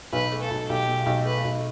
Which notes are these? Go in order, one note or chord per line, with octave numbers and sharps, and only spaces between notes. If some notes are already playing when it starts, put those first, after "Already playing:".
B1 B4
A3
A4
B1
B1 G4
B2
B1
A3 B4
B1